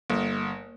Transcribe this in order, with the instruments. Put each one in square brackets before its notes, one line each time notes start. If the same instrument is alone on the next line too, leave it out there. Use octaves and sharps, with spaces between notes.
[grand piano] G1 [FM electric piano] A#3